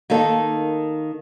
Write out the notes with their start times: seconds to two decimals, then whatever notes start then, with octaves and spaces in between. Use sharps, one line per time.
0.10 D#3 A#3 D#4 A4